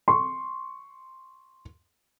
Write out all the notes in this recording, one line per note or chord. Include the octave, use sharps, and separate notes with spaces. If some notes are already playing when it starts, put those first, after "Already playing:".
C6 C#6